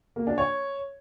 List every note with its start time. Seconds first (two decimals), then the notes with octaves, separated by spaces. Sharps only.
0.16 A#3
0.27 D4
0.38 C#5